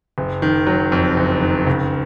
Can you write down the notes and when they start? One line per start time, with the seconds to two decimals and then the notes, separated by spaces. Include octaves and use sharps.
0.18 F#1
0.42 D#3
0.67 F#3
0.92 F2
1.17 F#1
1.41 D#3
1.67 C#2